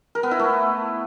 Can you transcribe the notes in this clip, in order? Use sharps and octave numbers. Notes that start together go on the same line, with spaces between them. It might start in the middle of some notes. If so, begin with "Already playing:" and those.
A#4
B3
E4
A3